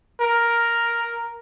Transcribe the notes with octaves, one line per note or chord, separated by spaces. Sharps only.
A#4